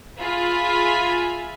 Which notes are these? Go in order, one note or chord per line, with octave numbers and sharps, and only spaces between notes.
F4 G#4 E5 F5 G#5 B5